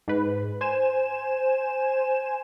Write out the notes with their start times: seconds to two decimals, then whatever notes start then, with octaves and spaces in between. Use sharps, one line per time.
0.08 G#2 B4
0.61 C5 G#5 E7